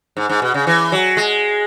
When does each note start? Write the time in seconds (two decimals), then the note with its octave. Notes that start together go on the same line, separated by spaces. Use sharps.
0.17 G#2
0.30 G#2
0.42 B2
0.54 C#3
0.67 E3
0.92 F#3
1.17 G#3